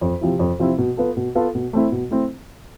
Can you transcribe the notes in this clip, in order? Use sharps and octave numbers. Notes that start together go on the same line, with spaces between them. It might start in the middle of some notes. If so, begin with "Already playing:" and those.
F2
C3 F3 C4 E4
F2
C3 F3 C4 E4
B2
B3 F4 A4
B2
B3 F4 A4
B2
A3 C4 E4
B2
A3 C4 E4